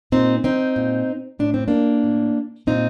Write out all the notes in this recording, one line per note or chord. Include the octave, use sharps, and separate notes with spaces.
A#2 C4 D#4
C4 D#4
A#2
A2 D4
C4
A#3 D4
A2
A#2 C4 D#4